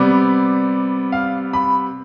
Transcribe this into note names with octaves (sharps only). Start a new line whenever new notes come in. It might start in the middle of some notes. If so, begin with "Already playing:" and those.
Already playing: C3 G3 B3 D5
F5
B5